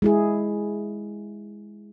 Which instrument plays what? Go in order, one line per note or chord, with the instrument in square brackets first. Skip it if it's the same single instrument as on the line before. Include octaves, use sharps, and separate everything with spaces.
[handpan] G#3 E4 G#4